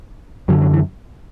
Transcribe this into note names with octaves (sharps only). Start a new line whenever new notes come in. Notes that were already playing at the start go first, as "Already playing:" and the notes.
F#2 D3 F#3
F#3
E3